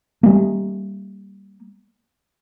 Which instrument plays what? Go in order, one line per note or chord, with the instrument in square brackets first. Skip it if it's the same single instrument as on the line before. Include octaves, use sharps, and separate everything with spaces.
[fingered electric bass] G3 A#3